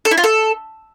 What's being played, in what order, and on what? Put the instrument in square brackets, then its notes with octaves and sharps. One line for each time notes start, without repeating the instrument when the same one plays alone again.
[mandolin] A4
E4
F4
A4